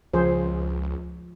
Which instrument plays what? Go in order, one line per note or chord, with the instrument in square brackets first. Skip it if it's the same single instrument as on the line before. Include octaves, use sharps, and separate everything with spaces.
[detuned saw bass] C#2 [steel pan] F3 G#4 C5